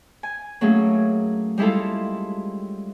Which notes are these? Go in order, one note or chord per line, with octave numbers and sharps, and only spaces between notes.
G#5
F#3 A3 A#3 C#4 G#4
G3 G#3 E4 F4 A4